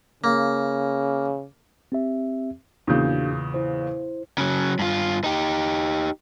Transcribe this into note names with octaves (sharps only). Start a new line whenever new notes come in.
C#3 A#3
C4 G4 E5
E2 A#2 C#3 D4 F#4 G6
E4 C5
C#3 F#3
G2 F4
D#4 G4